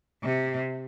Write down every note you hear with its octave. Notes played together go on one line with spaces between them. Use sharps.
C3